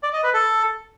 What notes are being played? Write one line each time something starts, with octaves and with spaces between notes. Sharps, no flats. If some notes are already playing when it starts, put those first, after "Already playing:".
D5
D#5
B4
A4